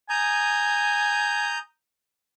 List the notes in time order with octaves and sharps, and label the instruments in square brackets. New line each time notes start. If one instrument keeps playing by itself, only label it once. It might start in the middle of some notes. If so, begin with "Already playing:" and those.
[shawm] G#5 [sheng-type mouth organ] A#5 D#6 G6